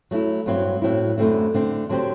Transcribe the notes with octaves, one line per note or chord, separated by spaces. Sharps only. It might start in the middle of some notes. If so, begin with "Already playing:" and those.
F#3 A3 E4
G2 F#3 C4 E4
A2 F#3 C4 E4
F#2 D3 A3 C4 E4
D3 A3 C4
D3 F#3 C4 G4 C5